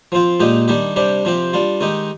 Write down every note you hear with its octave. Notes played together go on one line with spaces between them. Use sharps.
F3 C4 F4
A#2 G#3 D#4 G4
D#3 G3 D4 G4
C3 G3 D4 G4
C3 F3 C4 G4
G3 D4 F4
D#3 G#3 D#4 G4